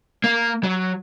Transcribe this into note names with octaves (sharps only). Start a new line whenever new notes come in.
A#3
F#3